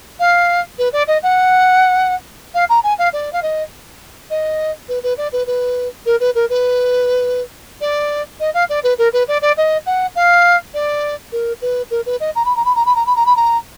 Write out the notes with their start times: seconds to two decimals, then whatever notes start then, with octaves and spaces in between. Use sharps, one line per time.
0.19 F5
0.78 B4
0.92 D5
1.07 D#5
1.22 F#5
2.54 F5
2.69 A#5
2.83 G#5
2.98 F5
3.13 D5
3.32 F5
3.42 D#5
4.30 D#5
4.88 B4
5.03 B4
5.17 D5
5.32 B4
5.46 B4
6.05 A#4
6.20 B4
6.35 A#4
6.49 B4
7.81 D5
8.40 D#5
8.54 F5
8.69 D5
8.83 B4
8.98 A#4
9.13 B4
9.28 D5
9.41 D5
9.57 D#5
9.86 F#5
10.15 F5
10.74 D5
11.32 A#4
11.61 B4
11.90 A#4
12.06 B4
12.20 D#5
12.35 A#5
12.45 B5
12.56 A#5
12.65 B5
12.75 A#5
12.85 B5
12.95 A#5
13.06 B5
13.16 A#5
13.26 B5
13.36 A#5